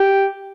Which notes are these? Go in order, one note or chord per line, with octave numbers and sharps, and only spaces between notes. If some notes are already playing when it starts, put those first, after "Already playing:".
Already playing: G4